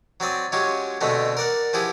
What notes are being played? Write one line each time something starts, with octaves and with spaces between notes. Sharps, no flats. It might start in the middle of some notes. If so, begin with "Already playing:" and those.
F#3 C4 D5 D#6
F#3 G#3 C#4 F4 G4
B2 D3 G#3 A3 B3 C4
A#4 D5 F#5
F3 B3 E4 G4 G#4